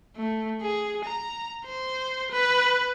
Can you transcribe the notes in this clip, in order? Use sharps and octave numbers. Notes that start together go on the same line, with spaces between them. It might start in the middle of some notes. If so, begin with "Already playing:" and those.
A3
G#4
A#5
C5
B4